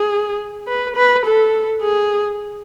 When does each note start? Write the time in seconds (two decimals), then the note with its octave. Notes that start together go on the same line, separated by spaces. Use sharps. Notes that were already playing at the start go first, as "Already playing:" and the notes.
Already playing: G#4
0.67 B4
0.96 B4
1.25 A4
1.82 G#4